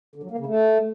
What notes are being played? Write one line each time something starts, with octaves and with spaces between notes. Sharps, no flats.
D3
F#3
A#3
C#3
A3